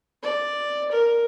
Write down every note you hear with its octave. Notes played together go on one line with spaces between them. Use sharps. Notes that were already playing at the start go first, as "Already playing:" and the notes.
D5
A#4